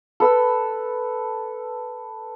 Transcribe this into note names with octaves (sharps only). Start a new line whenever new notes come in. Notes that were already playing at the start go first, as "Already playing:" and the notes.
A4 B4 E6